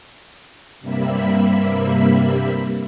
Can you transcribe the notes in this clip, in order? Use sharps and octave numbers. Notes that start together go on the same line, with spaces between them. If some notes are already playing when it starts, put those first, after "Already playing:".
G2 C3 G3 A#3 E5 B5